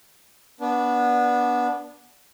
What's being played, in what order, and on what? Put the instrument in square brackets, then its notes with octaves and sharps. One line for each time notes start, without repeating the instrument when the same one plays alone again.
[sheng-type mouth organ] B3 D4